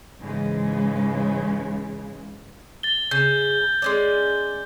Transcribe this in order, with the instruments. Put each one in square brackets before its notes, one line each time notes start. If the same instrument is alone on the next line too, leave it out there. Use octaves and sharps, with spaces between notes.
[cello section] G#2 C#3 E3 G#3
[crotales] A6 G7
[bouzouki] C#3 [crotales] G6
[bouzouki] G#3 C#4 D5